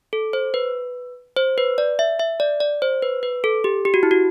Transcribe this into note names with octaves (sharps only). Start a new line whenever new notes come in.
A4
C5
B4
C5
B4
D5
E5
E5
D5
D5
C5
B4
B4
A4
G4
G4
F#4
E4
F#4